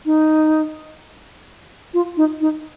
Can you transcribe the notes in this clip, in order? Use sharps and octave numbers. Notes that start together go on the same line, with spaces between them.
D#4
F4
D#4
D#4